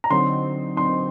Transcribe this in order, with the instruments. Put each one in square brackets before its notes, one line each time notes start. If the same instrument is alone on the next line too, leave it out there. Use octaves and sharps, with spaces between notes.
[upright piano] A#5
[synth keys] D3 F#3 C4 D#4 [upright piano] C6
[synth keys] D3 F#3 C4 D#4 [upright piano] C6